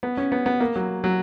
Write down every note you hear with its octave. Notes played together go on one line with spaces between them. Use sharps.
B3
C#4
B3
B3
A#3
F#3
F#3